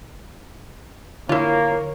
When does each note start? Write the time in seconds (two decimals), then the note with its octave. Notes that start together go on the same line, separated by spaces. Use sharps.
1.29 D3 A#3 E4 F4 A#4 C#5